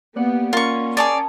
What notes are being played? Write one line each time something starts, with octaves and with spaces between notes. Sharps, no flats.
A#3 B3 G4 D5 F#5
C#4 F4 A#4 C#6
G#4 C#5 D5 A5 A#5 D#6